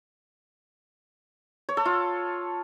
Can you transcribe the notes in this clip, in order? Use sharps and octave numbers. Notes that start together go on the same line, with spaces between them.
C#5
A4
F4